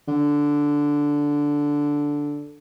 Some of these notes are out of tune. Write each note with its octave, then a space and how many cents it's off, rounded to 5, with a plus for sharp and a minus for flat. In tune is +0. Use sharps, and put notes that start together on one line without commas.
D3 -5